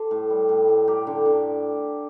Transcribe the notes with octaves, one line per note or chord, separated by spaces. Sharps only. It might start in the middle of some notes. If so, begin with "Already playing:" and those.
Already playing: G4 A4 C5
A2
G3
A2
A2
A3 G4 A#4
D3
D3